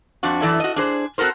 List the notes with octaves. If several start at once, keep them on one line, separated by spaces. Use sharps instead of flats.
F2 C4 D4 F#4
F#2 E3 E4 A4 D5
F#4 D#5
D4 G#4 C5
C4 F#4 A4 A#4 C5